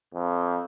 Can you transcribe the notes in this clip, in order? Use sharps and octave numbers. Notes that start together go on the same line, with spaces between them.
F2